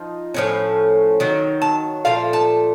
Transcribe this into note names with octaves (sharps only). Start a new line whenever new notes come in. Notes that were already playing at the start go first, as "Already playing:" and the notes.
Already playing: F3 D#4
A2 F3 A3 C#4
D#3 F#3
A5
A#2 F3 A3 F5
A5